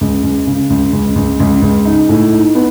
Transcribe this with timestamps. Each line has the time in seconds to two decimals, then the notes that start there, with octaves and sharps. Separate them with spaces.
0.01 C#2
0.23 C#2
0.47 C#3
0.70 C#2
0.93 C#2
1.16 C#2
1.40 C#2
1.62 C#2
1.85 D#4
2.09 A2
2.33 D#4
2.55 B3